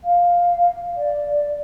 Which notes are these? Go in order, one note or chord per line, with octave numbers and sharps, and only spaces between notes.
F5
D5